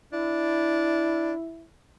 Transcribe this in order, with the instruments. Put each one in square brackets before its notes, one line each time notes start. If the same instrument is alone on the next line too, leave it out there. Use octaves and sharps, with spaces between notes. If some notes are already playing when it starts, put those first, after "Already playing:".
[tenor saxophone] D4 [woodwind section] E4